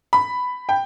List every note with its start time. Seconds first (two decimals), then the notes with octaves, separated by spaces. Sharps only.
0.13 B5
0.69 G5